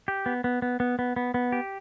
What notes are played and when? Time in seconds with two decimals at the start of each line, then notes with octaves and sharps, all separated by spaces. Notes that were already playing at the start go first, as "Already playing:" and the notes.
0.08 G4
0.26 B3
0.44 B3
0.62 B3
0.80 B3
0.99 B3
1.16 B3
1.34 B3
1.52 G4